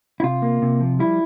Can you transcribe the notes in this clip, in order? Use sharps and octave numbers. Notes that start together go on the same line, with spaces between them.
E4
C3 F4
A#3
C3
F3
G3 E4